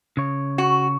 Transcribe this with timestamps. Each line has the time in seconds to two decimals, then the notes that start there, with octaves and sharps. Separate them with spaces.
0.17 C#3 C#5
0.58 F#4